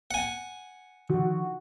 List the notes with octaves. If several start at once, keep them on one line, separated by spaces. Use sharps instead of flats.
F#5 G#5
D3 D#3 F3 F#4